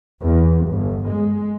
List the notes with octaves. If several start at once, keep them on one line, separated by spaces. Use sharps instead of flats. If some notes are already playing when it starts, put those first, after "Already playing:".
E2
G1
G#3